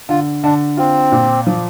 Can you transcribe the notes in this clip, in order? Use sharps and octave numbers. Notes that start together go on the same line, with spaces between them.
D3 F4
D3 D4
C4 F4
A#2
F3